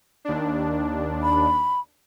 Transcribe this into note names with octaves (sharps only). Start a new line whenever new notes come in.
D#2 D4
B5